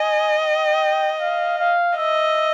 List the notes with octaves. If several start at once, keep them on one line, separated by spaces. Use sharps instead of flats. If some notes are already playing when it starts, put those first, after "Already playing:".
Already playing: D#5 G#5
G5
F5
F5
D#5 E5